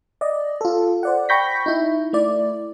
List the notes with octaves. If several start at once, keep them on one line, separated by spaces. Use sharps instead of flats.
D5 D#5
F4 A4
C5 D5 F#5
G5 B5 C#6 G6 A#6 B6
D#4 E4
A3 E4 D5